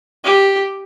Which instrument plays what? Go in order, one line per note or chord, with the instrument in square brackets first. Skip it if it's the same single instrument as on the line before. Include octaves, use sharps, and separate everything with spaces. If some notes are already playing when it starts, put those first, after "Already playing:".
[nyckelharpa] G4